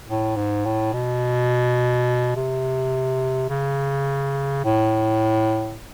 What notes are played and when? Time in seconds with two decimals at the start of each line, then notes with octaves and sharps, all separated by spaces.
0.08 A2
0.36 G#2
0.65 A2
0.93 B2
2.36 C3
3.50 C#3
4.64 A2